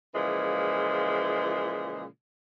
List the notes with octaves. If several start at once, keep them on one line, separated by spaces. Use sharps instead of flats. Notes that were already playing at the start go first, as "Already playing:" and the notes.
A#2 C#3 E3 F3 G#3